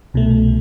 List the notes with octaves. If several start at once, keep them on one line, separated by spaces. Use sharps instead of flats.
C2 B2 A3